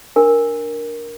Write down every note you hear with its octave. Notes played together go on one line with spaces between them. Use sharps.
D4 A#4